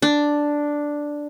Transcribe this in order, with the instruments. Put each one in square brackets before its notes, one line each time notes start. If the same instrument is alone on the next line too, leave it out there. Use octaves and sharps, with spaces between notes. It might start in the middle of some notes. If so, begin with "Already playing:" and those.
[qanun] D4